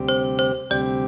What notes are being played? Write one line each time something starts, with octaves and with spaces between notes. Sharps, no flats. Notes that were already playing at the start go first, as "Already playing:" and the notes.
Already playing: D2 C3 G3 C4 G4
C5
C5
D2 C3 G3 C4 G4 D5